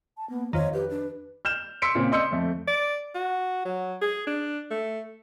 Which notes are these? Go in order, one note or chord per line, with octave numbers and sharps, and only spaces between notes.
A5
A#3 B3
F2 D#3 C#5 F5
G4 B4
D4
F6 G6 E7
C6 E6 B6 C#7 D7
A#2 C#3 C4
D5 D#5 C6 E6 G6 C#7
F2 A3
D5
F#4
F#3
G#4
D4
A3